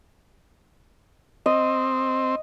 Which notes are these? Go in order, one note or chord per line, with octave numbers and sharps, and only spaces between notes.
C4 D#5